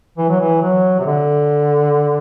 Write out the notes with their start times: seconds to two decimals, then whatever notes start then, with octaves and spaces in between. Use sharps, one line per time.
0.18 E3
0.29 F#3
0.40 E3
0.62 F#3
0.99 C3
1.06 D3